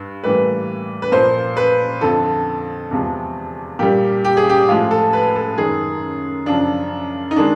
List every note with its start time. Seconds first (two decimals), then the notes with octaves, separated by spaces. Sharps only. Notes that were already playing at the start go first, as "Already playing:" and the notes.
Already playing: G2
0.24 A2 E3 G3 A#3 B4
1.02 B4
1.12 A#2 F3 A#3 C5
1.57 B4
2.01 F2 D3 F3 A4
2.91 E2 C3 F3 G#3
3.79 A#2 G3 A#3 G4
4.24 G4
4.37 G#4
4.49 G4
4.69 A2 F3 G#3 F4
4.91 A4
5.13 B4
5.36 A4
5.58 F#2 D#3 G#3 G#4
6.46 F#2 C#3 F3 D4
7.31 D#4
7.36 D#3 G#3 D4